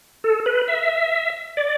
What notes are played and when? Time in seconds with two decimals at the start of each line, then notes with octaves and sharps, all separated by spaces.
0.24 A4
0.46 B4
0.68 E5
1.57 D5